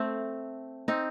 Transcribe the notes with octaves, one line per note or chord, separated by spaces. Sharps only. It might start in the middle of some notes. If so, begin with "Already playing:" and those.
Already playing: A3 C4
C4 D#4